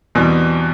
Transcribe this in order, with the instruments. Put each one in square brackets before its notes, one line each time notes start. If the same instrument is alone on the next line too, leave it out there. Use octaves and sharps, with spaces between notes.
[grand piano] E2 B2 G3 C4